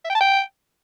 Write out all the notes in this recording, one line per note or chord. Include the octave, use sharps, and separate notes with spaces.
E5
G5
A5
G5